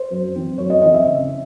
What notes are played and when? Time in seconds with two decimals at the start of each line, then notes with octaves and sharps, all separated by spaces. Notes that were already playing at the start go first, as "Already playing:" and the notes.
Already playing: C5
0.11 F#2
0.35 E3 C4
0.58 F#2 C#5
0.70 D#5
0.82 E3 C4 D#5
0.94 E5
1.05 C#3